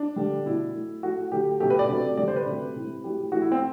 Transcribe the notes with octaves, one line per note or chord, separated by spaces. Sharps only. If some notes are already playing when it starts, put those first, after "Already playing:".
Already playing: D4
D3 G3
B2 A3 E4
A2 F#3 A3
A2 F#3 A3 F#4
D3 F#3 A3 G4
B2 F#3 A3 G4
B4
D5
C3 F#3 A3
D3 G3 D5
C5
B4
C3 F#3 A3
C3 E3 G3
A2 F#3 A3 G4
A2 E3 A3 F#4
E4
C4